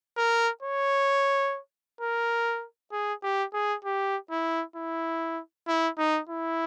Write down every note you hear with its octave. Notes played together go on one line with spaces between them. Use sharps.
A#4
C#5
A#4
G#4
G4
G#4
G4
E4
E4
E4
D#4
E4